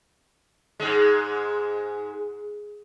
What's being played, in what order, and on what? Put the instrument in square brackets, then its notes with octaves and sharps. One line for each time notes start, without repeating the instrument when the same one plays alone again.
[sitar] G#2 G#3